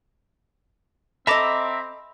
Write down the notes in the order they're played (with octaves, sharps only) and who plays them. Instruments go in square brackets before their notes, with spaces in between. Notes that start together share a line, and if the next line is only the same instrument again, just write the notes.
[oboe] C4 [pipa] A4 D#5 [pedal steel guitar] E5 A#5 D6 [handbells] B5 A#6